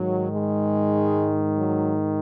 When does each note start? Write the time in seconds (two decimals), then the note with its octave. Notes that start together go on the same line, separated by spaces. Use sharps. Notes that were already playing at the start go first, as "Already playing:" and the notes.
Already playing: G#2 D#3 F#3
0.32 G#3
1.55 F#3